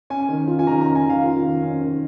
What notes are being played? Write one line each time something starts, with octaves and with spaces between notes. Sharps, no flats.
C#4 G#5
D#3
F4
G#5
D#3 A#5
A#5
C#4
G#5
D#3 F5
F4
D#3
C#4
D#3